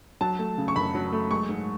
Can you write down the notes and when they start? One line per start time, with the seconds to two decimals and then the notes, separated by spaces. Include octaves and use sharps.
0.21 F#3 A5
0.39 A3
0.58 C#3
0.68 C#6
0.76 F#2 B5
0.95 F#3
1.12 A3
1.31 G#3 C#6
1.49 G#2